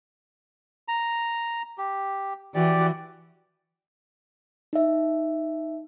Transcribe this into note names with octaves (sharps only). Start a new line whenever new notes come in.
A#5
G4
E3 F#4 G4 D5
D#4 E5